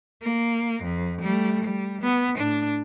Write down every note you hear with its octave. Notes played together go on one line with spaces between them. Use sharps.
A#3
F2
G3 A3
G3
B3
A2 D4